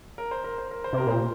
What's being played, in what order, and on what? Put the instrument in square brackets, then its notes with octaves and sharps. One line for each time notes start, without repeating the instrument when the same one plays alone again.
[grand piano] A#4
C5
A#4
C5
A#4
C5
[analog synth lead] C3 [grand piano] A#4
[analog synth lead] A#2 [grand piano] C5